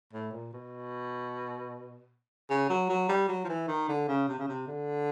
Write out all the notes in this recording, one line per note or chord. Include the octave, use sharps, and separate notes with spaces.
A2
A#2
B2
C#3
F#3
F#3
G3
F#3
F3
E3
D#3
D3
C#3
C3
C#3
C3
D3